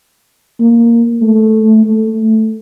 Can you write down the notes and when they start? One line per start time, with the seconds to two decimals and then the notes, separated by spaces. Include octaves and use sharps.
0.60 A#3
1.22 A3
1.84 A3